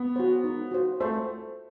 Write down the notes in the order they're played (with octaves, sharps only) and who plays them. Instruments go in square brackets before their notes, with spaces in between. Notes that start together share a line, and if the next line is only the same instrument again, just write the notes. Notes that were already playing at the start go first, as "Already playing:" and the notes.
Already playing: [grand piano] B3
[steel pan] F#4 C5
D#4
F#4 C5
[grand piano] A3 [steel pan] C5